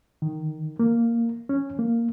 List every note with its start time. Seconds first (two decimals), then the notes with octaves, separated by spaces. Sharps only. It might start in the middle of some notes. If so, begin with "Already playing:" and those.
0.22 D#3
0.79 A#3
1.49 C#4
1.79 A#3